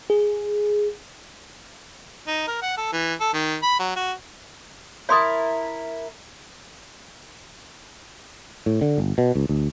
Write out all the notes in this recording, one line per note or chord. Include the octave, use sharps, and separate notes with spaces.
G#4
D#4
A#4
F#5
A4
E3
A4
D#3
B5
F#3
F#4
E4 A#4 C#5 A5 C6 D#6
A2
D3
G1
B2
C#2
D2